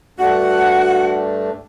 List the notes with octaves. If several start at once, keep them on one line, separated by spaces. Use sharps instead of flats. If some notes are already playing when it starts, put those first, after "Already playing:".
G2 A3 D4 F#4 F#5